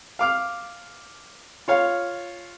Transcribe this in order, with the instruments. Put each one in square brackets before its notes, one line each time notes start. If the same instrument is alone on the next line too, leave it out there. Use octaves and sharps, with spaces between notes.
[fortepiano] F5 D6 F6
F4 C#5 F5